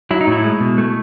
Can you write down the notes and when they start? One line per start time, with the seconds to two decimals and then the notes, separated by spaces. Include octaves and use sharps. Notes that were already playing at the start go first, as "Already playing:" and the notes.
0.11 F#3 E4
0.21 D#4
0.27 A2 E4
0.44 G#3
0.60 B2
0.78 A3